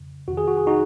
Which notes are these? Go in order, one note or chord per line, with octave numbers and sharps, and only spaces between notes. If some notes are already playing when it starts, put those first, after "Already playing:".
Already playing: F2 C#3
F2 C3 D#3 F#4
G#4
F#4
G#4
D#4 F#4